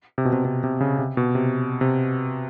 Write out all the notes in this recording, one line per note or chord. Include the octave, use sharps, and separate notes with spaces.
C3
B2
C3
C3
C3
C#3
C3
B2
C3
C3